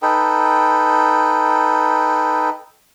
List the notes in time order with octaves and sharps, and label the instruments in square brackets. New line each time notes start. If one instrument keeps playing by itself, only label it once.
[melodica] D#4 A4 B4 G5